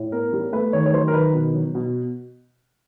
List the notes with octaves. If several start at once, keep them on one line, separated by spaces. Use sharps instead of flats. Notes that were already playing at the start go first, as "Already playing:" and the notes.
Already playing: A2
B3 A#4
G3
A3 B4
D#3 C#5
C#5
F#3 C5
A#4
D#3 B4
B2
F#3
B2